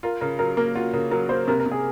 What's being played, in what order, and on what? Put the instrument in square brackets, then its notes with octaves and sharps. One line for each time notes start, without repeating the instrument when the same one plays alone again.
[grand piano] F4 [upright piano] A#4
[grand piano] C#3 [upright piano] A#4
[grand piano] F#3 [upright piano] A#4
[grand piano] A#3 [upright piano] A#4
[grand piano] F4 [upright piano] F#4
[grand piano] C#3 [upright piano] A#4
[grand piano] F#3 [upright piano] A#4
[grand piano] A#3 [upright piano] C5
[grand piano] C3 [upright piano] A#4
[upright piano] A#4
[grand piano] C3
[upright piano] G#4